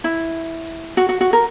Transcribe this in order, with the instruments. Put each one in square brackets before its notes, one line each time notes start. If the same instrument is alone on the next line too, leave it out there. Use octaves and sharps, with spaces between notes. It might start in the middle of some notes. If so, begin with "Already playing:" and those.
[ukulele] E4
F#4
F#4
F#4
A#4